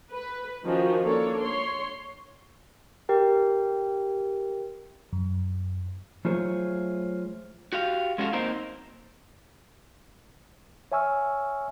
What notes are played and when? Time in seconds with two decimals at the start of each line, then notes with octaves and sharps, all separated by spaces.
0.12 B4
0.64 D#3 F3 C#4 F4 F#4
1.03 A#3 D4 A4 C#5
1.41 C#5 C6
3.09 G4 A#4 G5
5.13 F#2
6.25 F#3 A3 F4 G#4 C5 C#5
7.73 F#4 G4 F5
8.18 G#3 C#4 F4 F#4 A4 F5
8.33 A#3 C4 D#4 A#4 C5
10.92 C#5 E5 G#5 C#6 E6 F6